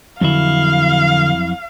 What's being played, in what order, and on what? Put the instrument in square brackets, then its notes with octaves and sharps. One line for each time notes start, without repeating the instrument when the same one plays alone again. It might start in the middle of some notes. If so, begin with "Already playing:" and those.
[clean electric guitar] F2 F#3 E4 [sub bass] D3 [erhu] F5